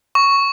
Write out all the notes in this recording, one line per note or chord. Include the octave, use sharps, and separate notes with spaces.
C#6